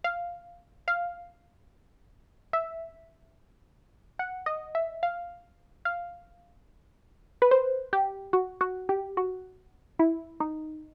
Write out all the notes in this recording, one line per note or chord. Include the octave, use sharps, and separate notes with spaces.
F5
F5
E5
F#5
D#5
E5
F5
F5
B4
C5
G4
F#4
F#4
G4
F#4
E4
D#4